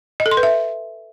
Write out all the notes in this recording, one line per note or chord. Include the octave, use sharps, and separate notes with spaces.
D#5
A4
C6
B4
E5